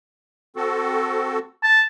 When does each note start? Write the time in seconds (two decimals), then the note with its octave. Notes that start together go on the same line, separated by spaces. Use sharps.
0.56 C4 F#4 A4
1.64 A5